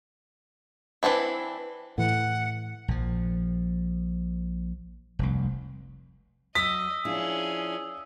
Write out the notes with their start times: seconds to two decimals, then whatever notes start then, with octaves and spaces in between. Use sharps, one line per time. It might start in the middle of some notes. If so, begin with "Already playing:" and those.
1.03 E3 C4 D4 E4
1.98 A2 E3 F#5
2.88 A#1 F3
5.19 F1 C2
6.55 F#3 D#5 D#6 E6 B6
7.05 F3 C#4 D4 E4 G#4